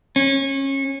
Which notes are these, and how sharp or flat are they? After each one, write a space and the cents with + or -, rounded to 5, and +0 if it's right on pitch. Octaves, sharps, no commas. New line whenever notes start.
C#4 -25